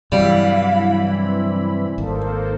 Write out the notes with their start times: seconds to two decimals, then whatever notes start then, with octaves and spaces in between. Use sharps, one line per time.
0.12 G2 C3 E3 F#3 G3 E4 F5 B5
1.15 C4
1.98 G#1 A#3 D#4 A4 C5